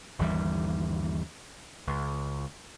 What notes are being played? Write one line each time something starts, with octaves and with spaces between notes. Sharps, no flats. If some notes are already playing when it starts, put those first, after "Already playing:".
G1 D#2 E3 G3
C#2